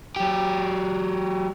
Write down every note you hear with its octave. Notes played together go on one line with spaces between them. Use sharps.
F#3 G4